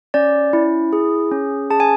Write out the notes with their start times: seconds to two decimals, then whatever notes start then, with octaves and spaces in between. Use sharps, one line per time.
0.14 C#4 D5
0.53 E4
0.93 G#4
1.32 C#4
1.70 G#4 A5
1.80 G#5